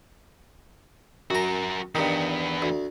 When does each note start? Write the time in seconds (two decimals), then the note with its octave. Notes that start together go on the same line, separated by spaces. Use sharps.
1.31 F#2 F#4 A#4 A#5
1.95 E2 G2 D#3 B3
2.62 D2